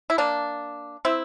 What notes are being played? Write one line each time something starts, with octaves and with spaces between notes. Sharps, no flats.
E4
A#3 D4
C4 E4